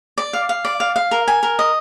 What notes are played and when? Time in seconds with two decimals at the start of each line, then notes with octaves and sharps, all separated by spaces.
0.18 D5
0.33 F5
0.49 F5
0.65 D5
0.80 F5
0.96 F5
1.11 A#4
1.27 G#5
1.43 A#4
1.59 D#5